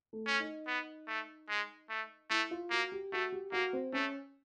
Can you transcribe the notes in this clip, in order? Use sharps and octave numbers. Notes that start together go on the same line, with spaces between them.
A3
C#4
D#4
B3
A3
G#3
A3
A3 E4
F4
A#3 F#4
G4
A3 F#4
G4
A#3 F#4
C4
A3 C#4